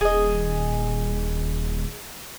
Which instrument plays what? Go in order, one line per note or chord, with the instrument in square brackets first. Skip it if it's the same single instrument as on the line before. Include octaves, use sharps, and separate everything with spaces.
[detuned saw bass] D#1 [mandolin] G#4 D#5